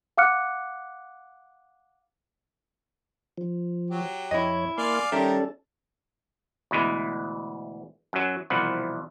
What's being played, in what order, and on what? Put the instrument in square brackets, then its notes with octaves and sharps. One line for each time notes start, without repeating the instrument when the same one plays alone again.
[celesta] F5 F#5 D6 F6 F#6 C#7
[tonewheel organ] F3
[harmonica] F#3 G4
[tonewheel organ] F2 C#5 [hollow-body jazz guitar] E4 D#5
[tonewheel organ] A#3 C6 [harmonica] D5 F5 G#5
[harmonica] D#3 A#4 [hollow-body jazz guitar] G3 E5 G5 [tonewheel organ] C#4 A4 D5
[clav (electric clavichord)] D2 B2 E3 G#3
F#2 F#3
C2 B2 E3 F3 F#5